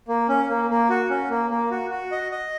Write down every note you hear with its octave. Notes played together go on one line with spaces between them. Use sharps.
A#3
C#4
A#3
A#3
F#4
C#4
A#3
A#3
F#4
F#4
D#5
D#5